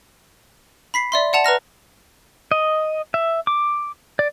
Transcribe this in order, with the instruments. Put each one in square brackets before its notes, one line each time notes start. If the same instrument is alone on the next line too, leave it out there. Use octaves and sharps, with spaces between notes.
[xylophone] B5 B6 C7
D5 E5 C6
D5 F#5 A5 F7
B4 A#5 F6 A#6
[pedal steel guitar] D#5
E5
D6
D5